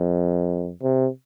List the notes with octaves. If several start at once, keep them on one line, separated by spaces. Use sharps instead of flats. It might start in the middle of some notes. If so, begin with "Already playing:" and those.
Already playing: F2
C3